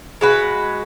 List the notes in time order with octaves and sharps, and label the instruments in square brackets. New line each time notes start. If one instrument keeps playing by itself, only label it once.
[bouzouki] G#3 F#4 B4